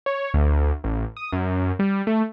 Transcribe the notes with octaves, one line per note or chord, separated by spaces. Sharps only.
C#5
D2
A1
D#6
F#2
G3
A3